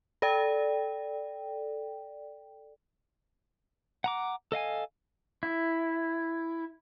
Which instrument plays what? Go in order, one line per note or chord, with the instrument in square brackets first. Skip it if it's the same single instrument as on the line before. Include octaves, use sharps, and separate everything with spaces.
[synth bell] A4 D5 G5
[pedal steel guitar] F#5 A#5 D6
A4 D#5 F5 G#5
E4